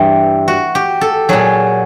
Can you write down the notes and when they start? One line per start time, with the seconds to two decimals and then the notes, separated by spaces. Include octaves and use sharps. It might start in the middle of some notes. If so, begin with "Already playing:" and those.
Already playing: G2 E3 G3
0.48 F#4
0.75 G4
1.01 A4
1.29 A#2 F#3 G#4